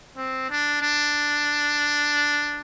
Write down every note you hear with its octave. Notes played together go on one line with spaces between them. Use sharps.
C4
D4
D4